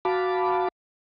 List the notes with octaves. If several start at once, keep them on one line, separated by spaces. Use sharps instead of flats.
F#4 F5 A5 B5 D6